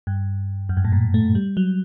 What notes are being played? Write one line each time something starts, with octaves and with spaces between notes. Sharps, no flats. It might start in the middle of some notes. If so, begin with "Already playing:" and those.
G2
F#2
G2
A2
A#2
A3
G3
F#3